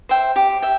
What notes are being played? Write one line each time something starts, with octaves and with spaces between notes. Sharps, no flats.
C5 E5 G5
G4
E5 G5